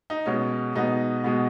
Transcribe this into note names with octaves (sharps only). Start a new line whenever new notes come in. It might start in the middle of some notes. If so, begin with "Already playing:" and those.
D#4
B2 G#3 B3 C#4
B2 G#3 B3 D#4
B2 G#3 B3